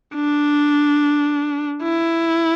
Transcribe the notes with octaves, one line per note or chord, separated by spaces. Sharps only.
D4
E4